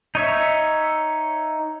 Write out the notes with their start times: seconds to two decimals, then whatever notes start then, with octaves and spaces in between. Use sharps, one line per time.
0.15 D#4 C#5 E5